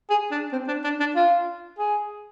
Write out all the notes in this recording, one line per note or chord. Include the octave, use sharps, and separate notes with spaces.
G#4
D4
C4
D4
D4
D4
F4
G#4